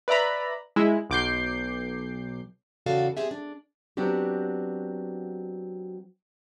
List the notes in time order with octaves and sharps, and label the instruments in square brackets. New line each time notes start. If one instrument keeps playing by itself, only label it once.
[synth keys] B4 D5 E5 A#5 B5
G#3 E4
B1 D6 G6 C7
[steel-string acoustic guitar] E2 C#3 F#4 A4 D5 F5
C4 D4 G4 G#4 E5
D4
[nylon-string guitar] F#3 B3 C4 D4 F#4 G4